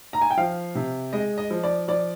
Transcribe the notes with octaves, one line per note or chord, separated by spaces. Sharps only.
A#5
G#5
G5
F3 F5
C3
G#3 D#5
D#5
F3
D5
F3 D5